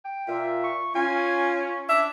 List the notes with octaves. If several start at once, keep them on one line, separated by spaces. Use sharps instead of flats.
G5
A#2 F4 E5
C#6
C#4 F4 G#5
D4 E5